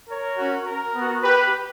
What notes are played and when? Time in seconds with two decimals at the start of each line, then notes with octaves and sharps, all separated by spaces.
0.08 A#4 C#5
0.37 C#4 F#4
0.66 A#4
0.94 B3 F#4
1.23 G4 B4